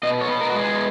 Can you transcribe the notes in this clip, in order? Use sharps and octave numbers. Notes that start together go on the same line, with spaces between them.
B2 D#5
C#5
B3
A#4
G#3 F#4
G#4